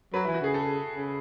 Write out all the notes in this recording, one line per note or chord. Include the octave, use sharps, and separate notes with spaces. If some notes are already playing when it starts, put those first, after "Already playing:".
F#3 B4
E3 E4
F#4
C#3 G#4
A4
C#3